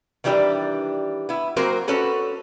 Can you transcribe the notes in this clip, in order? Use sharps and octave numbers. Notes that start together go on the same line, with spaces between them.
D#3 E3 G3 D4 G4
B3 E4
F#3 A#3 C4 F#4 A#4 C5
C#4 F#4 A4 B4